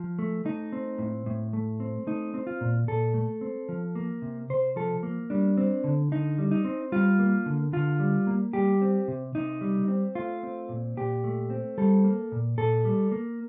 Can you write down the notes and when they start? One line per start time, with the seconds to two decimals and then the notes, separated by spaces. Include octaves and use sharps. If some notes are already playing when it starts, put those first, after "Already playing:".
Already playing: F3
0.19 A3
0.45 A3 D#4
0.72 C4
0.99 A2
1.26 A2
1.53 A3
1.80 C4
2.07 A3 D#4
2.34 C4
2.47 F4
2.61 A#2
2.88 A#2 A4
3.14 A3
3.41 C4
3.69 F3
3.95 A#3
4.22 C3
4.50 C3 C5
4.76 F3 A4
5.03 A#3
5.30 G3 D4
5.57 C4
5.84 D3
6.12 D3 D#4
6.38 G3
6.51 D#4
6.65 C4
6.92 G3 F4
7.19 A#3
7.46 D3
7.72 D3 F4
7.99 G3
8.27 A#3
8.53 G3 G4
8.81 C4
9.08 C3
9.35 C3 D#4
9.61 G3
9.88 C4
10.15 A3 F4
10.43 C4
10.69 A#2
10.97 A#2 G4
11.24 A3
11.50 C4
11.78 G3 A4
12.04 A#3
12.32 A#2
12.58 A#2 A4
12.85 G3
13.12 A#3